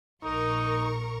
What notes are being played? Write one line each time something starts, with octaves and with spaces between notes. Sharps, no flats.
A#1 D#4 A#4 C#6